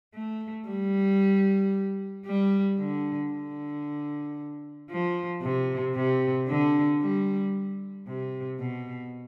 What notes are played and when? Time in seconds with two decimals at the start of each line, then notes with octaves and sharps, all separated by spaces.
0.14 A3
0.68 G3
2.26 G3
2.79 D3
3.31 D3
4.90 F3
5.43 C3
5.96 C3
6.48 D3
7.02 G3
8.07 C3
8.60 B2